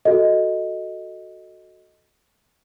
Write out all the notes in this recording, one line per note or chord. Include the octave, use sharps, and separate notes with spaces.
F#4 A4 D#5